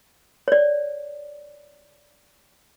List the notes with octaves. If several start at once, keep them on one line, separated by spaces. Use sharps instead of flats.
C#5 D5